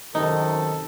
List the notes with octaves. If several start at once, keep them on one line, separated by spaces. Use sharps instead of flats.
F#2 C3 D#3 D#4 A4